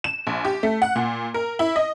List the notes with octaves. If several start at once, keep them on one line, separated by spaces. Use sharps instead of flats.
E7
A#1
G4
A3
F#5
A#2
A#4
E4
D#5